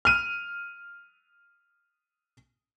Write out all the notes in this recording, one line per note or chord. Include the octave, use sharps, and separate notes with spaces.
F6 D#7